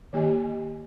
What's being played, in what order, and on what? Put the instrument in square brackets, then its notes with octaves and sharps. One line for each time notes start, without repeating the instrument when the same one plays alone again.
[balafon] D#3 A#3 G4 D#5 G#5